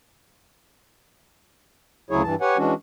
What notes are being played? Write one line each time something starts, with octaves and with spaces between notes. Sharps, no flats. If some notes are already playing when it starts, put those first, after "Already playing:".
D2 C#3 F#3 E4 G#4 C#5
G2 E3 A5
G4 B4 C#5 F#5 G#5
E3 G#3 C#4 D4 F#4